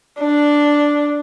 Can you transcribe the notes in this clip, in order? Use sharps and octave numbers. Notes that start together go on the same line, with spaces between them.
D4